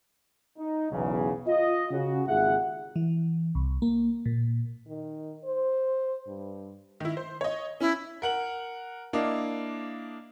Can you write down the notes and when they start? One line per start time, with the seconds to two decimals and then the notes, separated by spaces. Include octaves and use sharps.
0.58 D#4
0.91 B1 E2 C#3
1.47 F4 D#5
1.91 C#3 F#4
2.27 G#1 D#2 F4 G#4 E5 F#5
2.96 E3
3.55 C2
3.82 A#3
4.26 A#2
4.87 D#3
5.44 C5
6.28 G2
7.00 D#3 E4
7.17 C5
7.41 C#5 D#5
7.81 C#4 E4
8.22 A#4 F#5 F#7
9.13 A#3 D4 E4 D#5 F5